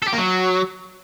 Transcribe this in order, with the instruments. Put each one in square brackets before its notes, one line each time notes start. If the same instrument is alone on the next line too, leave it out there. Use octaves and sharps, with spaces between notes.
[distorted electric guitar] A4
G4
A#3
F#3